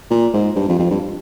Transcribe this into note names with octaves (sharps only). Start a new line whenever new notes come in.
A#2
G#2
G2
F2
F2
G2